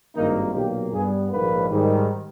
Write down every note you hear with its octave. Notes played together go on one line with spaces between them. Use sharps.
G#1 G2 D#3 A#3 D#4
B1 A#2 A#3 G4
G2 G3 B3 G#4
A#1 G#2 D#3 A#3 B4
G#2 D#3 G3